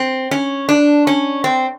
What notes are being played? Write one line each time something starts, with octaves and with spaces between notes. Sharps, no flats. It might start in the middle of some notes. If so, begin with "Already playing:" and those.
Already playing: C4
C#4
D4
C#4
C4